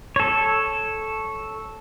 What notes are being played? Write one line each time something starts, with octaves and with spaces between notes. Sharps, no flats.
A4 C#5